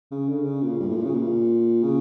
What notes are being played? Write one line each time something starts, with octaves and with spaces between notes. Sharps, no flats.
C#3
D3
C#3
A#2
G2
A2
A#2
C#3
A#2
C#3